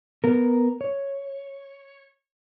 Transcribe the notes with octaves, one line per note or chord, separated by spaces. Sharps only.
B3 A#4
C#5